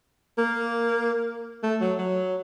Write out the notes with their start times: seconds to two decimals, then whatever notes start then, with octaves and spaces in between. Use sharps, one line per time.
0.38 A#3
1.63 A3
1.81 F#3
1.98 F#3